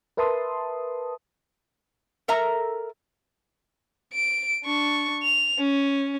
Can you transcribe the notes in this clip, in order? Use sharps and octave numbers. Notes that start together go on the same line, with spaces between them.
A#4 B4 E5 A5 C6 D#6
A4 A#4 E5 A#5
D7
D4 C#6
F7
C#4